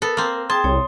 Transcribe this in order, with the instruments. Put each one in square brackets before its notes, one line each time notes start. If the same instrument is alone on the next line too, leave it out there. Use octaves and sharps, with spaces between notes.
[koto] B3 A4 [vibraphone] A#4
[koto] A#3 C4
[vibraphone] G#4 G5 [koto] A5 [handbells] C6 D#6
[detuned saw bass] C2 [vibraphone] C#5